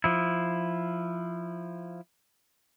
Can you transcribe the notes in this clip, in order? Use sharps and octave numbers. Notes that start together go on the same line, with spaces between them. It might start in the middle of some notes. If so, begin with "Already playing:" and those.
F3 E4